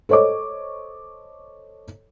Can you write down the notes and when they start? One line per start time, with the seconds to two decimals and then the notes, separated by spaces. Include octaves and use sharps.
0.09 A4 C5 C#5 D#5 D6